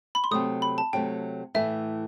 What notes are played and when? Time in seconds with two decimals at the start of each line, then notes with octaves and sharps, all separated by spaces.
0.15 B5
0.24 C6
0.31 C3 F#3 A3 D#6
0.62 B5
0.78 A5
0.93 C3 F#3 A3 G5
1.54 A2 E3 A3 E4 E5